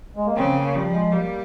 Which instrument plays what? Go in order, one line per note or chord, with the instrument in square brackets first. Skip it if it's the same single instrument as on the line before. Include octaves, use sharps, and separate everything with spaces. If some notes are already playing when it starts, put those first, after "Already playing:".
[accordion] G#3
A#3
[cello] C#3 [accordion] C4
[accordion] A#3
[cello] F3 [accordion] G3
[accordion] G#3
[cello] G3 [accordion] A#3